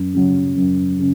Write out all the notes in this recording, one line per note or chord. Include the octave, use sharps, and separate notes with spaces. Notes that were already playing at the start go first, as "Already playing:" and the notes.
Already playing: F#2
C#3 F#3
F#2
C#3